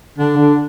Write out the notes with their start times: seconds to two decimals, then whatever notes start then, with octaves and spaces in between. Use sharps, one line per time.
0.18 D3 D4
0.37 D3